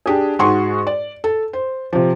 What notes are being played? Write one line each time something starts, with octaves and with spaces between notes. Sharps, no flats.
D4 G4 G#4
G#2 F#4 G#4 C6 C#6
D5
A4
C5
C3 F3